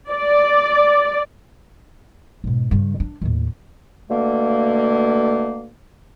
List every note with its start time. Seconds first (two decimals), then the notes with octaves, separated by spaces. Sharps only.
0.10 D5
2.44 G#2 B2
2.71 G2 C#3
3.00 D4
3.22 D#2 A2
4.10 B2 D3 A3 A#3